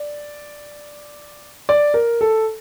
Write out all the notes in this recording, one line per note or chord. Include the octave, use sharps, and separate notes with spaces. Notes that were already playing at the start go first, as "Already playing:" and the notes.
Already playing: D5
D5
A#4
A4